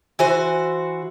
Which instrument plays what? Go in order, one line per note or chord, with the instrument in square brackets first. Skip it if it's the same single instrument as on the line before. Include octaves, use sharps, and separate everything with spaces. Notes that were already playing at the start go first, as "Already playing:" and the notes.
[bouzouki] E3 F#4 C5